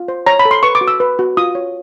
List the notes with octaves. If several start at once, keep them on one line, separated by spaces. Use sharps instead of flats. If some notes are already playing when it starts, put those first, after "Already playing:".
Already playing: F4
C5
C#5 A#5
B5
A4
C6
B4 C#6
D6
F#4
E6
B4
F#4
F4 D#6
C#5